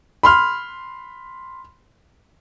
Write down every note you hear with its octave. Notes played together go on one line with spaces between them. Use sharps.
B5 C6 F6